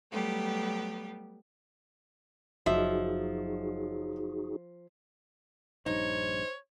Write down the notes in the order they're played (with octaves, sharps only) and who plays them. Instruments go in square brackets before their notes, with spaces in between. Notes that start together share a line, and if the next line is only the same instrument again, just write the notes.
[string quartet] F#3 G3 A3 B3 G4
[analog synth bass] F#1 [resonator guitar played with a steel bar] F3 E5 [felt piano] F#3 D#5 [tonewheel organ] D#4 F#4 G#4
[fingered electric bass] A#1 G2 [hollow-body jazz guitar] D#4 [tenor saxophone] C5 [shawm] C#5